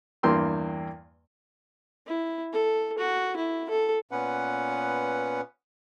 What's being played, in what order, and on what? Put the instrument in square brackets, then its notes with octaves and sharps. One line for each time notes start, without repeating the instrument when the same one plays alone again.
[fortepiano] E2 G2 A#3 G5 C6 E6
[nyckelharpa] E4
A4
F#4
E4
A4
[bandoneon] A#2 B3 C#4 B4 F#5